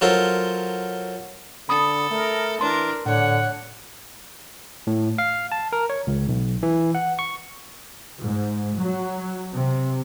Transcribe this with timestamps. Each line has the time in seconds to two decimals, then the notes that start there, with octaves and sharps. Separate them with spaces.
0.01 F#3 F4 A4 A#4 C5
1.69 D3 A4 B5 D#6
2.11 A3 A#4
2.61 E3 D4 A#4 C6
3.06 A2 D3 C#5 F#5
4.87 A2
5.18 F5
5.52 A5
5.73 A#4
5.90 C#5
6.07 C#2
6.28 B1
6.63 E3
6.95 F#5
7.19 C#6
8.21 G#2
8.78 F#3
9.54 C3